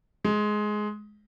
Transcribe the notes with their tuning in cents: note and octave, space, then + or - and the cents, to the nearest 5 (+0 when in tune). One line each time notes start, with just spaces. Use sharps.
G#3 +15